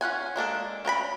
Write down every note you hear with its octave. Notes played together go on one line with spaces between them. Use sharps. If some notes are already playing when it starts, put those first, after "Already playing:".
C#4 F4 F#5 G#5
G#3 A#3 D4 A4
C#4 G5 A#5 B5